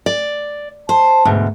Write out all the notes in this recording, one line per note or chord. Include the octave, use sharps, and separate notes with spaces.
D5
C5 A5
D2 G#2 B2